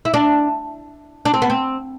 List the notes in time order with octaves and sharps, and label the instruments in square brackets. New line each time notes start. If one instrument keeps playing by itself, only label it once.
[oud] E4
D4
D4
C4
B3
C4